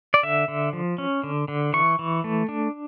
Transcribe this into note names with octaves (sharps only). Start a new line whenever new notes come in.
D5
D3 E5
D3
F3
C#4
D3
D3
E3 C#6
E3
A3
D4